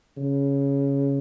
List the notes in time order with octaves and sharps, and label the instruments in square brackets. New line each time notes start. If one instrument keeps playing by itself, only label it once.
[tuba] C#3